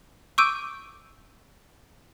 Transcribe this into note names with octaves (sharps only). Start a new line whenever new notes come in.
C#6 D6 E6 G6 D7 D#7